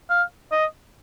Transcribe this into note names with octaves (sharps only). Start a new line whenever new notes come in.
F5
D#5